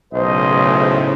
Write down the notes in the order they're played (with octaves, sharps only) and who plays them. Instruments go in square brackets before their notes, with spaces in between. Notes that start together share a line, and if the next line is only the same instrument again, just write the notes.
[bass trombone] B1 [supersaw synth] A2 C#3 [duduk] C5 [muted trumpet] D#5